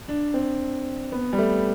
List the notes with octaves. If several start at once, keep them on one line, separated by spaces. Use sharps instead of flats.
D4
C4
B3
G3
A3